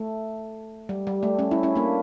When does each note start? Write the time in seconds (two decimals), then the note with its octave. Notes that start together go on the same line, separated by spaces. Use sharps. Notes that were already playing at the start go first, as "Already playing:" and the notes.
Already playing: A3
0.89 G3
1.07 G3
1.23 A3
1.39 A3 C#4
1.51 C#4 E4
1.63 C#4 E4
1.75 A#3 D4